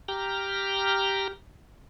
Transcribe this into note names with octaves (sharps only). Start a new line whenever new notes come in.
G4 G5 A#5 F6